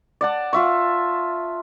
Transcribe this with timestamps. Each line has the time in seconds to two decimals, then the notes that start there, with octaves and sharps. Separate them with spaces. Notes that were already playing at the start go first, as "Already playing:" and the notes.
0.21 D5 F#5 A5
0.53 F4 E5 C#6